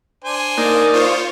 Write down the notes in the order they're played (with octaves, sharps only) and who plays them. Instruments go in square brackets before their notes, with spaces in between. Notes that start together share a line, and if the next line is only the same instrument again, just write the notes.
[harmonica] D4 C5 G#5
[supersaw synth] A#3 [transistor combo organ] D#4 D5 [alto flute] A#4
[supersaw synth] F4 C5 [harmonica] C#5